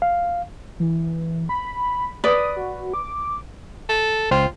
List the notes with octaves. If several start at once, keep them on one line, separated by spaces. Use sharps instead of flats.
F5
E3
B5
B4 D5 D#6
F#4
D6
A4
C#2 F4 C5 G5